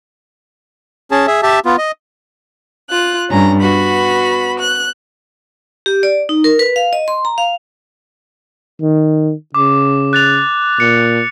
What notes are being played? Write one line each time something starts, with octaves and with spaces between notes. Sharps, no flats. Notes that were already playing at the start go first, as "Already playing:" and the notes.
C#4 G#4 A5
G#4 E5
G4 E5 A5
B3 F4
D#5
F4 F#6
G2 C#4 A#5
B3 F#4 B5
F#6
G4
D5
D#4
A#4
B4
F5
D#5
C6
A#5
F5
D#3
C#3 D6
F#6 A6 F7
A#2 C#7